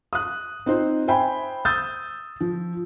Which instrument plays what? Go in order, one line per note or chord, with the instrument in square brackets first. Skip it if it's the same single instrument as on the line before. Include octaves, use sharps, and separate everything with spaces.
[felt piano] D#6 F#6
C4 D#4 F4 C5
C5 E5 G5 G#5 B5
D#6 E6 G6 A6
F3